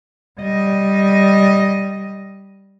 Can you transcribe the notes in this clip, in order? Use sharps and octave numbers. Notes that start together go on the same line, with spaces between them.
G3 D#5